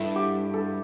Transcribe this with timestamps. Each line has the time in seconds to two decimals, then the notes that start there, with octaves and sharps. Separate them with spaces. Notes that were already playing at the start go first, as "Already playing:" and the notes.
Already playing: G2 E4 A4
0.16 G4
0.54 A4